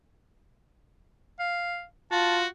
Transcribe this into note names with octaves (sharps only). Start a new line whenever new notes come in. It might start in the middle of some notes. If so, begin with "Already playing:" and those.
F5
F4 F#4 A5